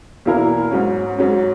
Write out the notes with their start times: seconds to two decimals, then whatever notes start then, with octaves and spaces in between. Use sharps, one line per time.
0.26 E2 B2 A#3 E4 A#4
0.71 G#2 F#3 C#4
1.18 G#2 F#3 C#4